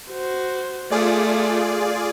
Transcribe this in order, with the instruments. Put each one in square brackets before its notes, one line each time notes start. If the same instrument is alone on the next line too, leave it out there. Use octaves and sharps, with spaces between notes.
[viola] F#4 C5
[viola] A3 [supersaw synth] F4 G#4 D5